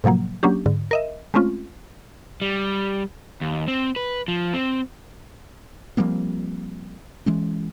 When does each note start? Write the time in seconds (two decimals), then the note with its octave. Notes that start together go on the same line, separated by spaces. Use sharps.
0.04 A2 C3 F3 F#3 A#3
0.43 F#3 A#3 C#4 D4 G4
0.66 G#2 D3
0.91 A#4 D#5 E5
1.34 G#3 A3 C4 C#4 F4
2.42 G3
3.41 D#2
3.68 C4
3.96 B4
4.28 F3
4.54 C4
5.97 F3 G3 A#3 C4
7.26 E3 G#3 C#4